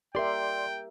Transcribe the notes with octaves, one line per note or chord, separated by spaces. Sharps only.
G4 A#4 D5 E5 G5 C6